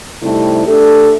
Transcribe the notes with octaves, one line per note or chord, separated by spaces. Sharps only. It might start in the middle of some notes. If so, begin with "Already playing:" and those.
C3 G3 A3 C4 D#4 E4
A3 D4 G4 A4